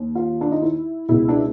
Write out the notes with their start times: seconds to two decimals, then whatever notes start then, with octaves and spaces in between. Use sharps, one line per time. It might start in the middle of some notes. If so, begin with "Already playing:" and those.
Already playing: D#2
0.15 F4
0.41 D4
0.52 D#4
0.62 E4
1.08 C#2 B2 E4
1.29 D4